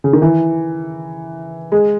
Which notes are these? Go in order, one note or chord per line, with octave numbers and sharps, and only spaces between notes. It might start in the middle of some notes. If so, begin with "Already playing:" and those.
C#3
D#3
E3
G#3